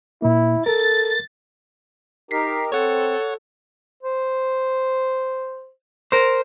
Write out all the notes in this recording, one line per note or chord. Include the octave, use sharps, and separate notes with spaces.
A#2 A#3 E4
A4 A#4 A6
D#4 G4 A#4 B6 C7
C4 A4 C#5 F#5
C5
A#4 C5